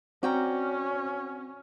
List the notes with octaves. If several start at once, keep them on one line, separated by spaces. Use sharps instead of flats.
C4 C#4 F#4 D5 G5 A#5